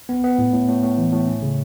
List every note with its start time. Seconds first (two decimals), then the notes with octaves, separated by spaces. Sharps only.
0.09 B3
0.24 B3
0.38 A2
0.53 A2
0.68 A2
0.83 A2
0.98 E3
1.12 A2
1.28 C#4
1.42 C#3